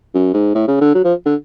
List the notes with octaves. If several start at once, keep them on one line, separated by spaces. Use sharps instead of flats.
F#2
G#2
A2
C#3
D3
F#3
F3
D3